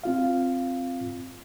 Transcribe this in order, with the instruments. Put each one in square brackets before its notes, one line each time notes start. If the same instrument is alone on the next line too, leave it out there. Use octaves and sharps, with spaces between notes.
[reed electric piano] C4 F4 F5